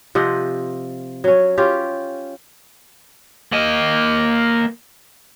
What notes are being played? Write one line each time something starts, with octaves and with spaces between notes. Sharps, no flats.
C3 F3 D#5 F#5
F#3 C#4
C#4 F4 G4
A#3 D#5